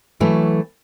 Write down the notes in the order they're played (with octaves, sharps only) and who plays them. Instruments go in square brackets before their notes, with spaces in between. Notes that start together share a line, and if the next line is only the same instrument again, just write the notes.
[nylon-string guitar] E3 F#3 A3 E4 F#4 A4